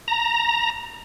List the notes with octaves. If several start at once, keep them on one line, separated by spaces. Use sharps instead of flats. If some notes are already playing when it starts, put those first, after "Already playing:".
A#5